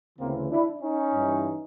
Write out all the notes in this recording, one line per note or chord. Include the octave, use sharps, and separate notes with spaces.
D2 C#3 E3 A#3 C4
D4 E4
C#4 D#4
G2 E3